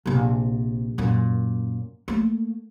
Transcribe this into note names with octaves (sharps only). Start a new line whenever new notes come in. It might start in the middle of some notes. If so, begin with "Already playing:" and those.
A#1 C3
F#2 A#2
A3 A#3